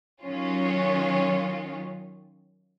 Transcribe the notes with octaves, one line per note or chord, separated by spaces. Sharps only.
D#3 F#3 C#4 F4